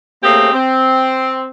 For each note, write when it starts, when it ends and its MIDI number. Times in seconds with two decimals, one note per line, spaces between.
0.23 0.50 57
0.23 0.50 58
0.23 0.50 60
0.23 0.50 61
0.23 0.50 67
0.23 0.50 68
0.52 1.50 60